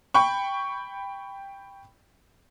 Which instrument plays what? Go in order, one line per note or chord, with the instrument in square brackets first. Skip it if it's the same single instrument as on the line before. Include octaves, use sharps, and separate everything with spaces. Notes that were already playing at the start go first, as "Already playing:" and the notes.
[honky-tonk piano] G5 B5 C#6